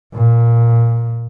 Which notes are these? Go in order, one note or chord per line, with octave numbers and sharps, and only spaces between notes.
A#2